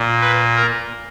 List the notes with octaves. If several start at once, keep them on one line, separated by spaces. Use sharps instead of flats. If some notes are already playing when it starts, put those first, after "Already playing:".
Already playing: A#2
B4
A#4